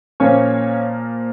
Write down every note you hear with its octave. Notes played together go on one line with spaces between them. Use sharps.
A#2 F3 A#3 C#4 C#5